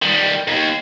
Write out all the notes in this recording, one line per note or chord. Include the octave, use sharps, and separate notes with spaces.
D#3 G3
D#2 G#2